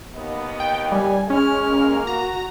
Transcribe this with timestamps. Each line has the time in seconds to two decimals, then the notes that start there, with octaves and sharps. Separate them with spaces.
0.15 D#2 B3 D#5
0.60 G5
0.92 G3 G#5
1.30 G#3 C#4 F6
1.69 A#3
2.07 F#4 A#5